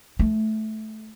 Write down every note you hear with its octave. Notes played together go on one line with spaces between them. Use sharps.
A3